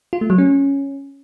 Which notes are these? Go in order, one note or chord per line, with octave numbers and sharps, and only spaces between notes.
F4
A3
F#3
C#4